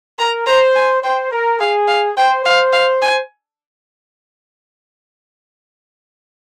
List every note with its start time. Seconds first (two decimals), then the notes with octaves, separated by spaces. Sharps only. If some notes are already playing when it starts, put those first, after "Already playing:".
0.19 A#4 A#5
0.46 C5 A#5
0.76 G#5
1.03 C5 G5
1.31 A#4
1.60 G#4 F5
1.88 F5
2.17 C5 G5
2.45 C5 F5
2.73 F5
3.02 G#5